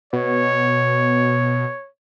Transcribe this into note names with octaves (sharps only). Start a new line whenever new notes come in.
B2 C#5